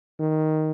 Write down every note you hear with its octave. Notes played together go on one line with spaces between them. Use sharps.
D#3